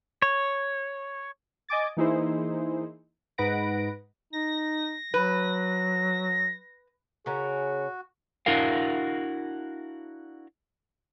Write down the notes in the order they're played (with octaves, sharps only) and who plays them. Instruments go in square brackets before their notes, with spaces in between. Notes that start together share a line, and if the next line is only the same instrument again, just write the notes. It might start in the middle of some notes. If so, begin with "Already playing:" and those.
[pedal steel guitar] C#5
[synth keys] D#5 G#5 D6 A6
E3 A#3 D#4 E4 G#4 C5
G#2 D#4 B4 F#5 A#6 D7
[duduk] D#4 [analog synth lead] A#6
[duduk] F#3 [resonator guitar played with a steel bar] B4
[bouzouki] C#3 C#4 A#4 [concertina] F#4 [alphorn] G#4
[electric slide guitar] D4 E4 F#4 A#4 F5